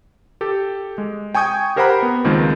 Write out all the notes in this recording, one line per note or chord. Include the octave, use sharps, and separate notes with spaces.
G4 A4
G#3
G5 G#5 C#6 D#6 G6 G#6
G4 A#4 C5 F#5 A#5 B5
B3
C#2 D#3 F3 G#3 A#3 C4